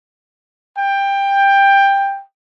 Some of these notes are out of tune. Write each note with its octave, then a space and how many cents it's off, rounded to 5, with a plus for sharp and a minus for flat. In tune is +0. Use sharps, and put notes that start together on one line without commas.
G5 +15